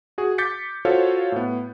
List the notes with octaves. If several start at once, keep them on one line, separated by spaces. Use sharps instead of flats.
F#4 G#4
D6 G6 A6 B6 C#7
F4 F#4 A4 C5 C#5 F5
A2 B3